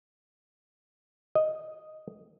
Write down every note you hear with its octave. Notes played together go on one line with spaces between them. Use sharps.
D#5